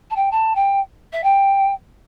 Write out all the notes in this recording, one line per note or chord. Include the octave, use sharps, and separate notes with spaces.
A5
G5
A5
G5
E5
G5